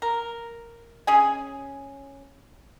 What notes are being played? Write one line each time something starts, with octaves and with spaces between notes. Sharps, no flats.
A#4
C#4 G#4 G#5